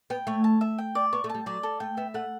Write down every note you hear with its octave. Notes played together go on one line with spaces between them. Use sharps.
B3 G5
A3 C#5
A5
E5
G5
D5
B3 C#6
A3
A5
G3
F#3 D5
A4
A3 G5
B3 E5
A3 F#5